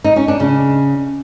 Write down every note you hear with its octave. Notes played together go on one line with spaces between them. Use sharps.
D#4
C#4
D4
C#3